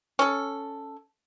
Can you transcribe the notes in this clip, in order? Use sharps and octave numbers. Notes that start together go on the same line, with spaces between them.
C#4 A4